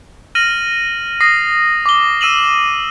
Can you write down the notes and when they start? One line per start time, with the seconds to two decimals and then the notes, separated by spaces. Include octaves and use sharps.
0.35 F6 A#6 D#7 F#7
1.21 D#6 A#6 C7
1.86 D6 G7
2.21 E6 D#7 E7 F#7